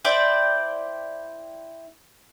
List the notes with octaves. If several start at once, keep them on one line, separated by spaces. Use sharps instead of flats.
E4 C5 D5 G5